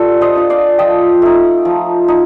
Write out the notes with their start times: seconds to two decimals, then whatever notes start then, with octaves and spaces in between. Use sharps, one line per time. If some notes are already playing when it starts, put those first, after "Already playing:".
Already playing: G3 D4 F4 A4
0.21 C5 D#5
0.36 D4 F4
0.50 D5 F5
0.79 F3 D#5 G5
1.22 A3 D#4
1.65 F3
2.08 D#4